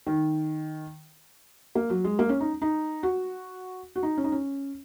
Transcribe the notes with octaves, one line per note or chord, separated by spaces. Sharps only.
D#3
A#3
F#3
G#3
A#3
C#4
D#4
D#4
F#4
F#4
D#4
C#4
D#4
C#4